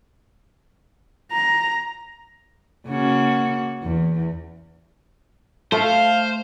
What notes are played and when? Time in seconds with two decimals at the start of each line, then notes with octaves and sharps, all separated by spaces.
1.32 A#5
2.87 C#3 A#3 F#4
3.83 E2
5.72 A3 A4 C5 F5